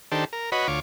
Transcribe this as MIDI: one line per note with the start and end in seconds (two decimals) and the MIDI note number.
0.12 0.25 51
0.12 0.25 62
0.12 0.25 67
0.12 0.25 69
0.12 0.25 72
0.33 0.50 70
0.52 0.67 66
0.52 0.67 71
0.52 0.67 73
0.52 0.67 75
0.52 0.67 83
0.68 0.80 38
0.68 0.80 65
0.68 0.80 73
0.68 0.80 86